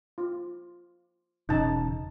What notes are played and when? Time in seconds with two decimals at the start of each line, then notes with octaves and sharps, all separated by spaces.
0.18 F4
1.49 E1 C#3 D#4 A5